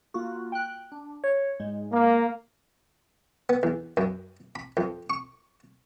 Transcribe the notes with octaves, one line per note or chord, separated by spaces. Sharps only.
A#3 F4 F#4
G5 F#6
D4
C#5
G#2 G#3
A#3
B3
E2
F#2
B5
F2
C#6